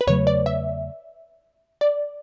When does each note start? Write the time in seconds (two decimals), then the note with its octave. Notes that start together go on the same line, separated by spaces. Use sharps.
0.01 B4
0.07 E2 C#3 F#3 A3 C#5
0.27 D5
0.46 E5
1.81 D5